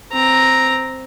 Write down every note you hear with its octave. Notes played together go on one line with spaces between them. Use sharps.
C4 A#5